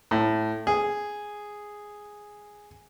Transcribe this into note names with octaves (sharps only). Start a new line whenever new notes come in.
A2
G#4